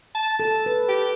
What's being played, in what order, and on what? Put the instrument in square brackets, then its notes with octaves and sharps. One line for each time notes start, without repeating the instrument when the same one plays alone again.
[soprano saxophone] A5
[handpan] A4
B4
[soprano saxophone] G4